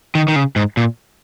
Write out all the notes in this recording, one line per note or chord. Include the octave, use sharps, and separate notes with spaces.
D#3
D#3
C#3
G#2
A#2